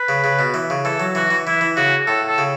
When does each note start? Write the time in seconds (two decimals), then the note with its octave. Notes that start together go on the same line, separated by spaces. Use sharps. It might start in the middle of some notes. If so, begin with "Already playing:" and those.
Already playing: B4
0.09 C#3
0.24 C#3
0.39 B2
0.54 E3
0.70 C#3
0.85 E3 A4
1.00 F#3
1.15 E3 F#4
1.31 E3
1.47 E3 E4
1.61 E3
1.76 C#3 F#4
2.07 A2 A4
2.28 A4
2.38 C#3